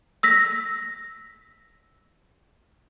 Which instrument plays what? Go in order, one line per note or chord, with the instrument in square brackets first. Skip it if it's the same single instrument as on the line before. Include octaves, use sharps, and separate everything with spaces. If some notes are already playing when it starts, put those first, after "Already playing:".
[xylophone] E6 A#6 B6